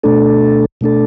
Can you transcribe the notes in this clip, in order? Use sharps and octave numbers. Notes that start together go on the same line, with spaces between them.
B2 A3 D4 A4
B2 A3 D4 A4